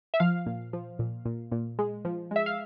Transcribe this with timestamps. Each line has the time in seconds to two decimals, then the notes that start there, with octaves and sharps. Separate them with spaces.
0.14 E5
0.20 F3 F5
0.46 A#2
0.73 F3
0.99 A#2
1.25 A#2
1.52 A#2
1.79 G#3
2.05 F3
2.31 G#3 E5
2.46 F5